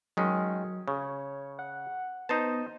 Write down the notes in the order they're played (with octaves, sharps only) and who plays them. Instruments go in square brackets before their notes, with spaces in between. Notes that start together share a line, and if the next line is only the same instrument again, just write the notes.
[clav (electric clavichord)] D#3 G#3 C#4 [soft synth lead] F#3
[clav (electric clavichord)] C#3 [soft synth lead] C#5
[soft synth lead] F#5
[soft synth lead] B3 [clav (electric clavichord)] D#4 C5 A5